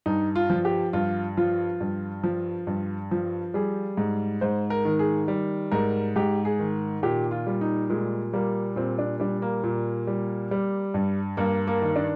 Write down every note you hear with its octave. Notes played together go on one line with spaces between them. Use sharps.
G2 D#4
F4
F3
G4
G2 F4
F3 F4
G2
F3
G2
F3
G3 G#4
G#2
G#2 C5
A#4
D#3
G#4
G3
G#2 A#4
G#2 G4
G#4
D#3
A#2 G4
F4
G3
D#4
A#2 G#3
G3 A#3
A#2 C4
D4
G3 D4
A#3
A#2
G3
G3
G2
G2 A#3
A#3
D#3
D4